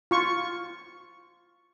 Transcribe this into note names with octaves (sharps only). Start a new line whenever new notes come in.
F4 C#6